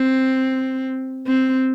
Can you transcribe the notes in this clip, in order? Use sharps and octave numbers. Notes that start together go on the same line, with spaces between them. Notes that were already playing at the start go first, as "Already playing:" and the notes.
Already playing: C4
C4